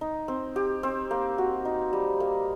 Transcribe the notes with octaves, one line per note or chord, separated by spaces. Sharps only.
D#4
C4
G4
C4
A#3
F#4
D#4
G3
A#3